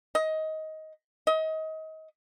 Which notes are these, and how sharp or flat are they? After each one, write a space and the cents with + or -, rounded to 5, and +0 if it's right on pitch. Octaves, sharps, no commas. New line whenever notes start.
D#5 +15
D#5 +30